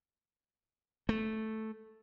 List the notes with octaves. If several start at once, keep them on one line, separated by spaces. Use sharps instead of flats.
A3